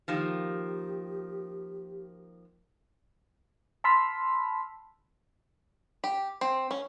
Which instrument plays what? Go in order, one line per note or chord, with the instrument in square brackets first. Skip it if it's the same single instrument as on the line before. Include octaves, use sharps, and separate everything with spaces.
[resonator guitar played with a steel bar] D#3 F3 A#3 [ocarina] G4
[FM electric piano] A5 B5 C6 E6 F6 B6
[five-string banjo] G4
C4
C#4